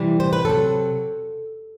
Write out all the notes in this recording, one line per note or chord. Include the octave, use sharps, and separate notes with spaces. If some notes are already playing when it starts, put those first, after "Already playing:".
Already playing: C3 E3 G3
C5
B4
C3 F#3 A4